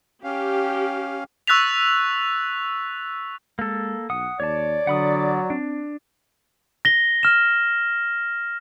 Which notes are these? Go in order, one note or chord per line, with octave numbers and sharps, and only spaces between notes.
C#4 G4 F5
C#6 E6 F#6 A6 B6 F7
G#3 A#3 A4
B1 F#5 D#6
D#2 C#5 D5 A5
D3 F#3 F#5 B5 D#6
C4 D4
A#6 G7
F6 E7